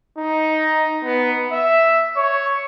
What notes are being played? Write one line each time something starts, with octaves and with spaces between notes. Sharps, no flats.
D#4
B3
E5
C#5